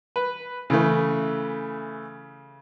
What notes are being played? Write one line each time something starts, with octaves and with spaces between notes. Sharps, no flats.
B4
C#3 E3 A3